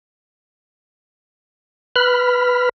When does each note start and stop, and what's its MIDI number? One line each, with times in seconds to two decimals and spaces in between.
1.96 2.69 71
1.96 2.69 83
1.96 2.69 89